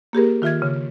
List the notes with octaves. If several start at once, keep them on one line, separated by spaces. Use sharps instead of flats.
A#3 G4 G#4 A#4
D#3 F4 E5 F6 G#6
C#3